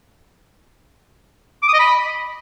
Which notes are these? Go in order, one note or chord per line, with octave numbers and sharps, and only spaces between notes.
D6
D#6
D#5
B5